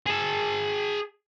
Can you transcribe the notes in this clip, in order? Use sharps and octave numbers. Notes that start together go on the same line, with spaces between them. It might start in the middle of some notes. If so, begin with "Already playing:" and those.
G#4 A5